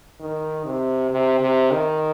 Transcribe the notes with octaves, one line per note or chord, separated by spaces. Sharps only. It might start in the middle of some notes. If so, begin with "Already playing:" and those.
D#3
C3
C3
C3
D#3